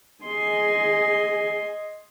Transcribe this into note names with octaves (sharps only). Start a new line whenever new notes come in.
G#4 D#5 G#5 C6